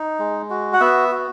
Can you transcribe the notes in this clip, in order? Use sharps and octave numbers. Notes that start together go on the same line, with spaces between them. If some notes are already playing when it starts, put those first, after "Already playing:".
Already playing: D#4
G#3
F#4
F#5
B3 E5
F#4